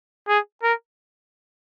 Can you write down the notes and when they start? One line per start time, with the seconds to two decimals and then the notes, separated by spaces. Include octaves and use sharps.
0.28 G#4
0.63 A#4